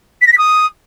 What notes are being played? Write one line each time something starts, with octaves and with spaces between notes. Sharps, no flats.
B6
A#6
B6
D#6